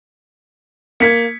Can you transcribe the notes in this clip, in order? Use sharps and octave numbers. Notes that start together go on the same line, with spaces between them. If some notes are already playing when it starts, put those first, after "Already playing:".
A#3 G#6 B6 C#7